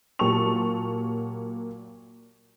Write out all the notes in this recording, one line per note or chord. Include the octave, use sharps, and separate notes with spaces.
A#2 F#3 G4 A5 C#6 F7